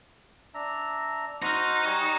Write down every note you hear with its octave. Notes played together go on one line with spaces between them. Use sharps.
D4 E5 A#5
D#4 F#4 C5 F6 F#6 A#6
G3 G#5 C#6 D#6